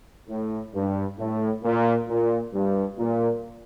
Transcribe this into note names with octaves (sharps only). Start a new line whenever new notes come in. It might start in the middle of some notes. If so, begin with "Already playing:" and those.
A2
G2
A2
A#2
A#2
G2
A#2